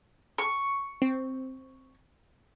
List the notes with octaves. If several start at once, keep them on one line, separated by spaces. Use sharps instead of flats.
C#6
C4